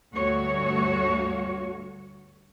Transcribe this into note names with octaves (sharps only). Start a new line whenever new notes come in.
D2 G2 A3 F#4 C#5